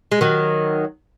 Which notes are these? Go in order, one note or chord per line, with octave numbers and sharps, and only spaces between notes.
G#3
D#3 F#3